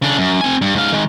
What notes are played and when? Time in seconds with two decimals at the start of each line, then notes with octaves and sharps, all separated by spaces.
0.02 C#3 D4
0.18 F#2
0.41 C4 G#5
0.62 G2
0.75 G#2 F5
0.93 D#3 G#3